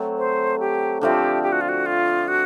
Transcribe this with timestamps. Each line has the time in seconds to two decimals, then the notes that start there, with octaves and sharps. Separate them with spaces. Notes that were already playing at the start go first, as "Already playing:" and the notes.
Already playing: F#3 A3 C4
0.18 C5
0.59 G4
1.01 D3 F3 A3 C4 G4
1.43 G4
1.52 F#4
1.61 F4
1.69 F#4
1.86 F4
2.28 F#4